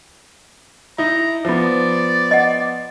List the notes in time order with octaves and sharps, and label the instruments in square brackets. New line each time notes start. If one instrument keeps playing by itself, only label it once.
[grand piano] D#4 E4 [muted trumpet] A#5
[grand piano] F3 B3 [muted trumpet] D5
[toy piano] D#5 F#5